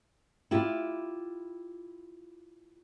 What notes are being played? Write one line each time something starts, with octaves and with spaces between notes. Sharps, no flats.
E4 F4 G4